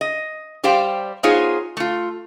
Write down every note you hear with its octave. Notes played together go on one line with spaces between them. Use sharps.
D#5
G3 G4 C5 F5 G5
B3 D#4 F4 G#4 C5 C#5
A3 F4